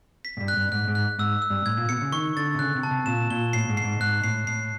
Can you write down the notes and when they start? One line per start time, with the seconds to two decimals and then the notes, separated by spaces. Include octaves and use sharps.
0.25 B6
0.37 G#2
0.40 G2
0.48 F#6
0.57 G2
0.72 G#2 F#6
0.88 G#2
0.95 F#6
1.19 G#2 E6
1.42 E6
1.50 G2
1.66 A2 G#6
1.77 A#2
1.89 B2 C#7
2.02 C#3
2.12 D#3 C#6
2.37 D3 A6
2.55 C3
2.59 C#3 F#6
2.75 C3
2.83 A5
2.91 C3
3.06 A#2 E7
3.31 A#2 G7
3.53 A2 C7
3.69 G#2
3.77 C7
3.84 G#2
4.00 G#2 F#6
4.24 A2 C7
4.47 A2 C7